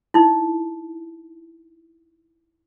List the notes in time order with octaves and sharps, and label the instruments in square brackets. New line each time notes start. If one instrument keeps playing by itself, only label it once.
[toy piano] D#4 E4